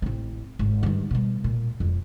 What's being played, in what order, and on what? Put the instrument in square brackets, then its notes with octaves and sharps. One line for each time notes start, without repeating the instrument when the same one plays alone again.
[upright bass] A1 C4
G#1
G2 D#3
B2 G3
A#2
E1 F2